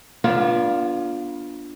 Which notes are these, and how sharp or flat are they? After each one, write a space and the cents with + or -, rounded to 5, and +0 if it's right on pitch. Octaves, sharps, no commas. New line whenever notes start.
B3 -35 D4 +0 F4 +5